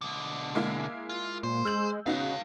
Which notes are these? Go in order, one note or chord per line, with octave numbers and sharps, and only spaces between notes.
B2 D3
G#3 A#3 E4
F4
A#2 C5
G#3 E6 G6 F#7
C#3 B3 D#4 F#4 B4 F5